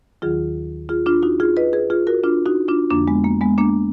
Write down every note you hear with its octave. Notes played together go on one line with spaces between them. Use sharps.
D#2 D#3 F#3 F4 G#4
F4 G#4
D4 F4
D#4 F#4
F4 G#4
B4 D#5
G#4 B4
F4 G#4
F#4 A#4
D4 F4
D#4 F#4
D4 F4
F2 D3 F3 A#3 D4
G#3 B3
A#3
G#3 B3
A#3 D4